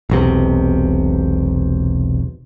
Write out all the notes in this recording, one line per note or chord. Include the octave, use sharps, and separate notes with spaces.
E1 B1 C3